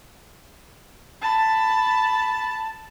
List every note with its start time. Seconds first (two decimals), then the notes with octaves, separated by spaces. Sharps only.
1.21 A5 B5